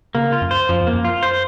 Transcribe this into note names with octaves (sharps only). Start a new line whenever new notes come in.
C#3 A#3
F4
F#2
C5
F#2 F3
F2
A#3
F#2
F4
C5